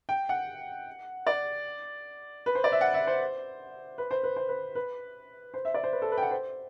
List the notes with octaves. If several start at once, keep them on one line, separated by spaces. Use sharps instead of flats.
G5
F#5
D5
B4
C5
D5
E5
F#5
E5
C5
B4
C5
B4
C5
B4
B4
C5
E5
D5
C5
B4
A4
B4
G5
F#5
C5